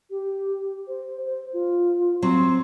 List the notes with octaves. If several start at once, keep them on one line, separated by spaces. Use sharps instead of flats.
G4
C5
C5
F4
F#3 C4 C6